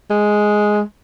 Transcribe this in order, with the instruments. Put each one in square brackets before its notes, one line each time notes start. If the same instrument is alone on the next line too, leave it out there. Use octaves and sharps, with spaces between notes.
[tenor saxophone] G#3